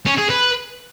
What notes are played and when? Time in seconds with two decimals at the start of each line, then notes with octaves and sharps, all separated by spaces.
0.06 C#4
0.18 G#4
0.29 B4